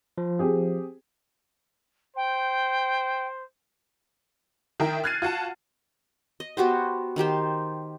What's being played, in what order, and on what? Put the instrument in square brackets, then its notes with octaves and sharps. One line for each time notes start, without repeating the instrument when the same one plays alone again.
[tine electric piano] F3
[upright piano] C4 G4 G#4
[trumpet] C5 [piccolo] G5
[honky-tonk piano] D#3 E4 A#4 G5
F6 F#6 G#6 A6 C7 D#7
F4 F#4 F#5 A5
[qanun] D#5
B3 F#4 G4 C5
D#3 D#4 G4 C5